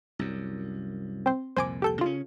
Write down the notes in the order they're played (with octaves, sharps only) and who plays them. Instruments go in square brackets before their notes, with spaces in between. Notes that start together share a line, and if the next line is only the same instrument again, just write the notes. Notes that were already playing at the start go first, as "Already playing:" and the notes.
[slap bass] C2 F#2
[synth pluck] C4 C5
[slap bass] C2 F2 A#2 [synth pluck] C5 G#5 D6
[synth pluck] G4 A4 G6
[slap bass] C#3 C4 C#4 [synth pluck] F4